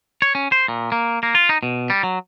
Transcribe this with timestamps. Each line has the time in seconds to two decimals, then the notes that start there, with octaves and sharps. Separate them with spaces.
0.22 C#5
0.35 C#4
0.52 C5
0.68 A#2
0.92 A#3
1.23 A#3
1.35 F4
1.49 D#4
1.63 B2
1.90 G3
2.03 F#3